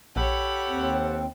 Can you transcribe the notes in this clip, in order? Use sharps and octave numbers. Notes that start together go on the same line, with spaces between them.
A#1 G4 A4 C#5 F#5 B5
D#2 C4